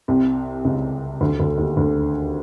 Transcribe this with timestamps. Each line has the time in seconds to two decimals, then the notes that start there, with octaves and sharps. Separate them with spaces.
0.08 C2 C3
0.65 C#2 C#3
1.21 D2 D3
1.40 D2 D3
1.58 D#2 D#3
1.77 D2 D3